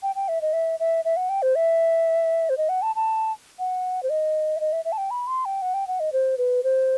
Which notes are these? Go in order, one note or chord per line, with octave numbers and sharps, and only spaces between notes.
G5
G5
E5
D#5
E5
E5
E5
F#5
G5
C5
E5
C5
D#5
F#5
A5
A5
F#5
C5
D#5
E5
D#5
E5
E5
A5
G5
B5
C6
G5
F#5
G5
F#5
D#5
C5
B4
C5